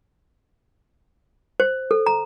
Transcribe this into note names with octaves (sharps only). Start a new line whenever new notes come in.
C5
A4
A#5